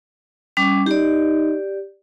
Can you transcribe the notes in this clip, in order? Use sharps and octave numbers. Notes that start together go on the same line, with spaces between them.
G3 C#4 D6
D#4 G4 D5